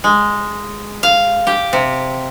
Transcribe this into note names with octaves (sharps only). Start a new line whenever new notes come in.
G#3
F5
G4
C3